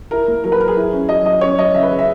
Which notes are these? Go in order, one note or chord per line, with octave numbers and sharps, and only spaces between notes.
E4 A#4
A#3
F#3 A#4
B4
F#3 A#4
G#4
E4
C#4
F#3 D#5
F#3 D#5
C#4 C#5
F#3 D#5
C#3 E5
B4
C#3
E5